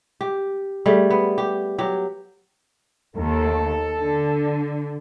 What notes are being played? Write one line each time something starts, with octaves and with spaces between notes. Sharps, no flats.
G4
G3 A3 G#4
B3
G4
F#3 G4
D#2 A4
D3